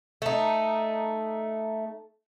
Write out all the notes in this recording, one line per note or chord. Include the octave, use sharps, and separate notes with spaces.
A3 D#4